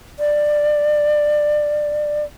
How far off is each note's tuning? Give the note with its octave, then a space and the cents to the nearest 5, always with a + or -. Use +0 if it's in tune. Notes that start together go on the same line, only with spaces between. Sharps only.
D5 +15